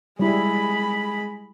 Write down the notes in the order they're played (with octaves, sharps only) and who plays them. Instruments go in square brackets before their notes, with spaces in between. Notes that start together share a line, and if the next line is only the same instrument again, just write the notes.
[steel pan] G3 E4 [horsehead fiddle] G#3 B5